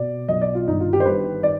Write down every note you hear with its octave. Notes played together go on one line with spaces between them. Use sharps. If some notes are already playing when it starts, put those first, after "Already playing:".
Already playing: B2 D5
B1 B2 D#5
D5
F4
G1 G2 D#3 D#4
F4
G4
C5
G1 G2 D#3 B4
D#3 D5